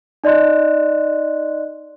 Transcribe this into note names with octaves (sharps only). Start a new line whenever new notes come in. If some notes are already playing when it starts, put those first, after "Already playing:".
D#4 D5 D#5 C6 F#6